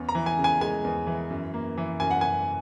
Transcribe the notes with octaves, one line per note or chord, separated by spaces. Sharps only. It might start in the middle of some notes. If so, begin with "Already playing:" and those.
Already playing: E2 C#4
A#5
E3
G#5
C#3
G#5
G#3 G#5
E2
E3
F#2
A#3
E3
F#2 G#5
F#5
F#2 G#5